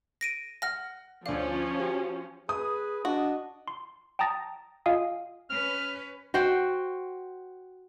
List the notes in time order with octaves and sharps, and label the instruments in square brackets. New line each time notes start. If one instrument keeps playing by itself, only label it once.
[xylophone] A#6 D7 D#7
[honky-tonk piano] F#5 [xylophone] F6 A#6
[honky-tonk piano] D2 D5 [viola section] F3 C#4 [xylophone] F5
[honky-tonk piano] F#4 G4
[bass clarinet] G#4 [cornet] B4 [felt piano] D#6
[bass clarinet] D4 [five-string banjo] F#4 [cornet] D#5
[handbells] C6
G5 A5 A#5 D#6 A6 A#6
F4 D#5 F5 G#5 D#6
[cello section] C#4 B4 [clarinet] F6
[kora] F#4 C5 F#5 G5